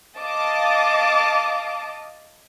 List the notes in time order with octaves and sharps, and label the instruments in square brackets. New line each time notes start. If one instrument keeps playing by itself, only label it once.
[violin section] D#5 F5 A5 D6